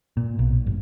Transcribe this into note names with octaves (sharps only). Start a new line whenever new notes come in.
A#2
B1
G1